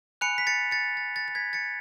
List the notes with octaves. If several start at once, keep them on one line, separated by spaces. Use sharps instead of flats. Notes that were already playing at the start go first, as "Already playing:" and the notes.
G#5 B5 F#6 C#7 F7
B6
A6 C#7
A6 C#7
A6
A6
A6
G#6 B6
A6 C#7